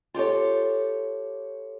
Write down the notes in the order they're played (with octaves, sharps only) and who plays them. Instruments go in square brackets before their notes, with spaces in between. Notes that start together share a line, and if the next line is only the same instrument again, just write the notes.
[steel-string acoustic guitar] F4 G4 A4 C#5